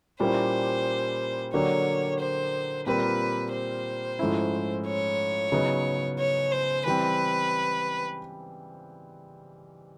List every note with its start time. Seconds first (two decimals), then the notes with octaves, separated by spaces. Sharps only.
0.20 A#2 G3 A#3 C#4 E4 C5
1.53 D3 F#3 A#3 D4 G4 C#5
2.20 C5
2.86 A#2 G3 C4 F4 A#4 B4
3.52 C5
4.19 G#2 F3 A3 C#4 E4
4.86 C#5
5.52 C#3 F#3 B3 D#4
6.18 C#5
6.52 C5
6.85 E3 G3 C4 B4